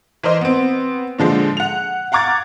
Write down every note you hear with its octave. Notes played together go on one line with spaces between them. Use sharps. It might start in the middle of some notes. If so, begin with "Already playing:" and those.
E3 A#4 C5 D#5
B3 C4
A#2 D3 F3 G#3
F#5 F7
F5 F#5 A#5 D6 G#6 A6